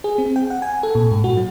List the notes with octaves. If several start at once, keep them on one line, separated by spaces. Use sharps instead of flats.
G#4
C4
G5
F#5
G#5
A4
A#2
G#2
F#4
F#3